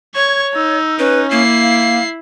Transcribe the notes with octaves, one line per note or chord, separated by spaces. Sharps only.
C#5 C#6 G#6
D#4 E6
C#4 B4
A#3 E4 C7
F5